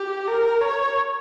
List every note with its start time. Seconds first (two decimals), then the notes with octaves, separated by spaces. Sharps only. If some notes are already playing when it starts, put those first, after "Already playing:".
Already playing: G4
0.28 A#4
0.61 C#5